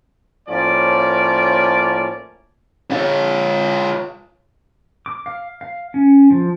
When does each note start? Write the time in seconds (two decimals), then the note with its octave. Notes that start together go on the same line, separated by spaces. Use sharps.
0.49 A2 F3 A#3 C#4 D5
2.91 F4 C#5
5.06 D6
5.26 F5
5.61 F5
5.94 C#4
6.31 F3